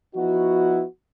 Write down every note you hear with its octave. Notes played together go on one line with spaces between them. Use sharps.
F3 B3 D#4 E4 F#4